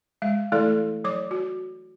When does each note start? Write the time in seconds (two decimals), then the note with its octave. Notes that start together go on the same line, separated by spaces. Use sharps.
0.22 G#3 E5
0.52 E3 A3 E4 A4 D5
1.04 F#3 C#5 D6
1.31 F#4